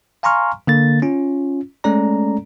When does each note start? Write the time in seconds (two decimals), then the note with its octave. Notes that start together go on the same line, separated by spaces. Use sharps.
0.23 F5 G#5 A#5 C6 C#6 F6
0.67 D3 A#3 A6
1.02 C#4 F4
1.84 G#3 A3 C#4 A4 D5 A#5